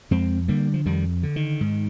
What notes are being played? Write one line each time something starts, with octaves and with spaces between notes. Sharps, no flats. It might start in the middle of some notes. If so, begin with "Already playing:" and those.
F2 G#3 C4
D3 G3 A#3
F3
F2 D#3 G3
D3
D#3
G#2